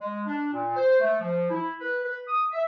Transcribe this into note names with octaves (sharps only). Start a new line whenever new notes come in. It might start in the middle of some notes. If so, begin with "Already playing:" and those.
G#3
D4
A#2
C5
A3
F3
E4
B4
B4
D#6
E5